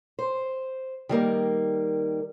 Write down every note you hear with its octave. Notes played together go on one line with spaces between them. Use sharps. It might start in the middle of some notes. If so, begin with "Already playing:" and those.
C5
D#3 G3 A#3